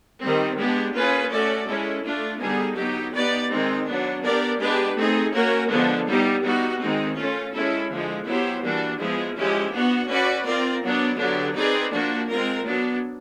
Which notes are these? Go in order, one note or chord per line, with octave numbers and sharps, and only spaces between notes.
D#3 G3 C4
G#3 B3 D4 G4
A#3 C#4 F4 G#4 B4
A3 C#4 F#4 A4 D5
G#3 C#4 E4 A4
A3 D4 F4
D3 G3 B3 D#4 G#4
F#3 B3 D#4 G4
B3 D#4 G4 B4 D5
D#3 G#3 C4 D#4
F#3 B3 D4
B3 D4 G4 A#4 D5
G#3 B3 D4 G4 B4
A3 C4 D#4 G#4
A#3 C#4 F#4 A#4
D3 F3 G#3 B3 D4
G3 B3 D#4 G4
G3 B3 D#4 F#4
D#3 G#3 C4 D#4
A3 C#4 F4
G#3 C#4 E4 A4
D3 F3 G#3
F#3 B3 E4 G4 C5
E3 G3 A#3 D4 F#4
F3 G#3 B3 E4 G#4
F3 G#3 C#4 E4 G4
B3 D4 F#4
C#4 F#4 B4 D5
C4 F4 A#4 D5
F#3 B3 D4
D3 F#3 B3 D4 G4
C4 D#4 G#4 B4 D5
F3 A#3 D4 F#4
G#3 C4 F4 A#4
F#3 B3 D4